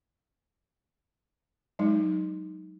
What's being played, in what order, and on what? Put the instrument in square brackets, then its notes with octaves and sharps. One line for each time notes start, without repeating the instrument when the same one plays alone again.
[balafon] F#3 G#3 D#4